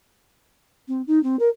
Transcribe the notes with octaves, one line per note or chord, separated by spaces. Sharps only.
C4
D#4
C4
A#4